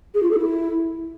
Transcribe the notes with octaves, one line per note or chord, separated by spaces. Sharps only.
G#4
F4
A4
E4